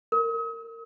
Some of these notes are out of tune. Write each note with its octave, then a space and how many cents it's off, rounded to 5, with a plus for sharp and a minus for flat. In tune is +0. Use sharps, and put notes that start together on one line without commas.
A#4 -25